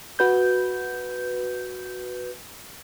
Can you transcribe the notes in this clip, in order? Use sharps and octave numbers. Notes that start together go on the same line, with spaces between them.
F#4 B4 G6